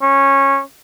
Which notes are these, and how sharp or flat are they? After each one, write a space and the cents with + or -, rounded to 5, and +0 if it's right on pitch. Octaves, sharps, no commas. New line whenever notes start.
C#4 -15